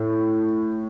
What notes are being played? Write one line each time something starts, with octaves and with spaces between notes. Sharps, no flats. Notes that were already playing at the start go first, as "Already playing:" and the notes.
Already playing: A2